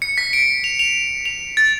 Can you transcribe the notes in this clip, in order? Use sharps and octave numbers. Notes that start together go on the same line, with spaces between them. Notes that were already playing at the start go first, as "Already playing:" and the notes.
C#7
B6
D7
F7
F7
F7
A6